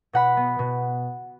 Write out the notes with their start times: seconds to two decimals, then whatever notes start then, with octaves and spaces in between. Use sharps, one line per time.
0.13 B2 F#5 B5
0.37 B3
0.59 B2